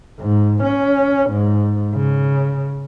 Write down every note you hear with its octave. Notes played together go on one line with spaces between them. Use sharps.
G#2
C#4
G#2
C#3